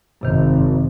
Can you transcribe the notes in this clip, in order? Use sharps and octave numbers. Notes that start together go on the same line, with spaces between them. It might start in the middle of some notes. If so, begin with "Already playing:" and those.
G#1 F#2 C3 D#3